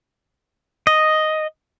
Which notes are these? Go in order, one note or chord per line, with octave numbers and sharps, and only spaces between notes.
D#5